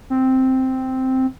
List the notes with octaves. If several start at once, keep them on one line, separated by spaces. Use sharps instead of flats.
C4